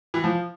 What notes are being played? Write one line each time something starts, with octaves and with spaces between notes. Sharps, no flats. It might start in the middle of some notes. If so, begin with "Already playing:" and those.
E3
F3